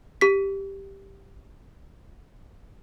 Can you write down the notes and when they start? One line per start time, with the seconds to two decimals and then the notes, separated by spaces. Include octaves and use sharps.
0.21 G4 B6